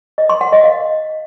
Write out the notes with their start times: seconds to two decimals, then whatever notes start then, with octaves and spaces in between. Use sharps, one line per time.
0.18 D#5
0.29 C6
0.41 F#5
0.52 D#5
0.64 F5